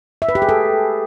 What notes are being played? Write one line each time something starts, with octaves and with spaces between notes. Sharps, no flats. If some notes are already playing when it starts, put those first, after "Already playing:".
E5
B4
G4
G#4
A4